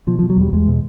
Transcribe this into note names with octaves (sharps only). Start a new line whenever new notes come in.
B2 F3
F3
B2
F#3
E2 G3
E2 G#3
B2